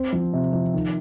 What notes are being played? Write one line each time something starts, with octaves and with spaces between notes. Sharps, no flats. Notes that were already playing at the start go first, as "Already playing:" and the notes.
Already playing: C4
F3
C3
F3
D#3